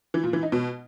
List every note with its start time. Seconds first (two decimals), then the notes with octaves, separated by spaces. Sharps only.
0.14 E3
0.24 A#2
0.33 E3
0.43 D#4
0.52 B2